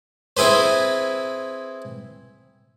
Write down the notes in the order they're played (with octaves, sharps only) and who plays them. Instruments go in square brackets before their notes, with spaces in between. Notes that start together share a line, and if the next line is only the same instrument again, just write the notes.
[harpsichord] C4 E4 G#4 B4 C5